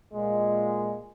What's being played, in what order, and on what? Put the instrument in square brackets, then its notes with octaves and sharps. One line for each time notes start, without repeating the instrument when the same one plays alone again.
[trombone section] A#2 G#3